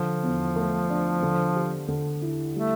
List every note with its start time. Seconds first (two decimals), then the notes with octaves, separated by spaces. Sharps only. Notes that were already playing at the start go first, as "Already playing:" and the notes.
Already playing: D3 F3
0.23 E2
0.56 A3
0.90 D4
1.22 D3
1.55 G4
1.88 D3
2.22 E4
2.55 G3 A3